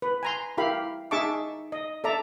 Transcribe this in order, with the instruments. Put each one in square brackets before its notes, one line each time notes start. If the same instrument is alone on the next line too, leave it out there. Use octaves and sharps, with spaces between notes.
[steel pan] B4
G#5 A#5 C6
E4 G4 A#4 F5 B5
D#4 G#4 E5 A5 C#6 D6
D#5
A4 D5 E5 A#5